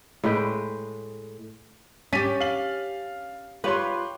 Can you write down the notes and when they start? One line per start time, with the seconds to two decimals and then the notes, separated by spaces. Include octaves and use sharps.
0.24 A2 G#3 B4 G5
2.13 C#4 G4 A6 B6 D#7
2.40 F5 F#7
3.64 F4 G4 B4 C#5 C6